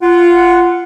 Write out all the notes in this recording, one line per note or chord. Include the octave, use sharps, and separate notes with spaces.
F4 F#5